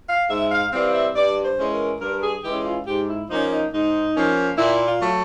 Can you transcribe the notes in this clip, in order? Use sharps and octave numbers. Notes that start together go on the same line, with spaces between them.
F5
G#2 E5
F5
E3 G3 C4 F5
E5
G2 D5
C5
E3 G#3 C#4
A#4
G2 A#4
G#4
E3 G#3 C#4 G4
F4
G#2 G4
E4
F3 A#3 C#4 D#4
D#4
G#2 D#4
F3 A#3 C#4
A#2 E4
F4
F#3 A3